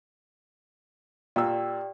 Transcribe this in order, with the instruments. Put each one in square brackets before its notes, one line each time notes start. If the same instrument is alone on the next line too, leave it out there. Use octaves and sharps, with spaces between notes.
[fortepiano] A#2 E6 [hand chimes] G4 D5 G5